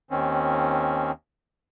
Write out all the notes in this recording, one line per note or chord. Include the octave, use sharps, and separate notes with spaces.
D#2 D#3 C4 C#4